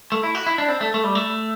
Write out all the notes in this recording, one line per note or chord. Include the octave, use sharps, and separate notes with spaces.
A3
E4
F#4
E4
D4
C4
A3
A3
G3
A3